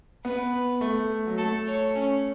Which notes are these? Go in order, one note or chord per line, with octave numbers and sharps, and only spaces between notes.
B3 B4
A3
F#3
A3 A4
C#5
C#4